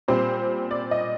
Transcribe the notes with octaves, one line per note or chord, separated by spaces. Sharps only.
A#2 G3 C4 C5
D5
D#5